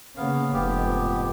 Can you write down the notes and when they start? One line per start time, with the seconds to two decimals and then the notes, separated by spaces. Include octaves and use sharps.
0.17 C#3 A#3 B3 F5
0.53 F1 G#2 B3 G4